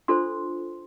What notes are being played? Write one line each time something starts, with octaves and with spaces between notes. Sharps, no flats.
D4 F4 A4 C5 C6